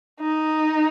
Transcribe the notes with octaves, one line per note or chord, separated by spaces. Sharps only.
D#4